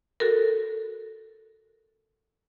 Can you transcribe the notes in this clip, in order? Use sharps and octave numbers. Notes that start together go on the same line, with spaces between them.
F#4 A4 A#4